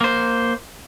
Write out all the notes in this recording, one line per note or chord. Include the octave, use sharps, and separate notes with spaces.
A#3 C5